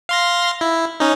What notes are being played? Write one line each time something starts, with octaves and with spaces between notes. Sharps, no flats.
F5 C6 A#6
E4
C#4 D#4